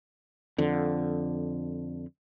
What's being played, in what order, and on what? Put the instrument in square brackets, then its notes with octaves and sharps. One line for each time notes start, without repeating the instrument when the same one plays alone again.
[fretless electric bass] F2 D3